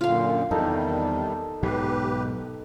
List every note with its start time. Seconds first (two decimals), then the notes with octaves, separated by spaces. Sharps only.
0.01 F#2 A#2 D3 F4 F5
0.51 E2 C3 D#3 G3 D#4 A4 A#4
1.63 B1 G#2 B2 G4 B4